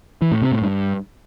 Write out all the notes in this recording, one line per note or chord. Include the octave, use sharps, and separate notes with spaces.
E3
A2
C3
A2
G2